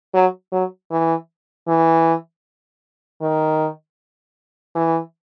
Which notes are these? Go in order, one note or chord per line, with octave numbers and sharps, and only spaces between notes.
F#3
F#3
E3
E3
D#3
E3